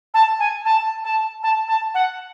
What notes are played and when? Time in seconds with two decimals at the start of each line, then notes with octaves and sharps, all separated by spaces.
0.14 A5
0.39 G#5
0.65 A5
1.04 A5
1.43 A5
1.68 A5
1.94 F#5